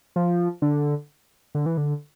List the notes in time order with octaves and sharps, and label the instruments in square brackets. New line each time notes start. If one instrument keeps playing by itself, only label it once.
[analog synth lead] F3
D3
D3
E3
D3